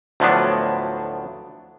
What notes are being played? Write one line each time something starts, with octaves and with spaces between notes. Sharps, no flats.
D2 A2 F3 F#3 B3 D4